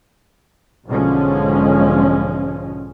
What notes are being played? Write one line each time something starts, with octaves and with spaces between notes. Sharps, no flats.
B1 G#2 D3 F3 G#3 C#4